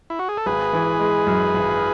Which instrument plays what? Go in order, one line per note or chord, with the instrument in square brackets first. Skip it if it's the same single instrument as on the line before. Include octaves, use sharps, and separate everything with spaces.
[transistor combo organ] E4
F#4
G#4
A4
[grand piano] G#1 [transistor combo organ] G#4 B4
[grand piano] E3
G#3
F#2
G#1